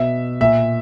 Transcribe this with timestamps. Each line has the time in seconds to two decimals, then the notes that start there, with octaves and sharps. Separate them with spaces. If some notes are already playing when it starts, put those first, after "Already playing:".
Already playing: B2 E5
0.41 A#2 E5